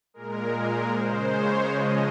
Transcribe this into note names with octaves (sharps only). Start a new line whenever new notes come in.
A#2 G#3 A#4
A#4
C#3 G#3 C5
C#5
C#3 F3 G#3 D#5